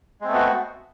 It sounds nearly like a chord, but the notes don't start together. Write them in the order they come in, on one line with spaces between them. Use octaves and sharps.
G#3 C4 A3 B3 F#4